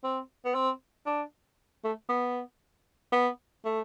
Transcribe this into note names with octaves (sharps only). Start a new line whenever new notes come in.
C4
B3
C4
D4
A3
B3
B3
A3